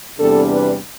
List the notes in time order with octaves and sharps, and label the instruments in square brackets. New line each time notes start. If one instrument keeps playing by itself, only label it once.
[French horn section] E2 C3 G3 B3 D4 A4
B4